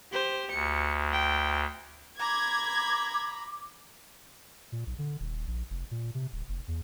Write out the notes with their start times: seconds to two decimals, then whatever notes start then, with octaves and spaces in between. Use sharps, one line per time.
0.12 G4 C5
0.51 D2 C#7
1.12 G5
2.19 A#5 B5 D6 G#6
4.72 A#2
4.87 B1
4.99 D3
5.20 D#1
5.47 A#1
5.70 F1
5.91 A#2
6.15 C3
6.32 D1
6.49 F1
6.68 E2